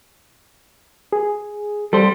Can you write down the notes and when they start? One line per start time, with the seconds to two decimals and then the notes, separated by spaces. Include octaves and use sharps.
1.12 G#4
1.93 G3 A4 C5